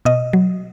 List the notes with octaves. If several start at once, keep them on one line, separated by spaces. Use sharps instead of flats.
B2 D#5
F#3